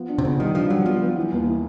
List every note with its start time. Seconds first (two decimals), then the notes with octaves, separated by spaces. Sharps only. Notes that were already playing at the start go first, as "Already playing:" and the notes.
Already playing: F3 B3
0.09 D4
0.18 C3
0.25 C#3 B3
0.40 D#3 G3
0.55 F3 D4
0.70 F#3 G3
0.86 F3 B3
1.01 B3
1.16 E3
1.32 D#2
1.47 E3